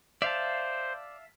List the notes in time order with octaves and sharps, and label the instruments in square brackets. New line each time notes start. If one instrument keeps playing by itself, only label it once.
[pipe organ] C5 [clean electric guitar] D5 [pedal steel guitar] E5 F5 A5